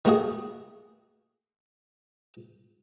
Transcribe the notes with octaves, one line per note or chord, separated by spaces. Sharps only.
D#3 A3 A#3 F#4 G#4